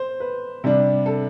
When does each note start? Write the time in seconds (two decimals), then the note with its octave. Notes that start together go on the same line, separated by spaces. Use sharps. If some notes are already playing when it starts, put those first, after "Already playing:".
Already playing: C5
0.20 B4
0.64 C3 G3 D4
1.06 A4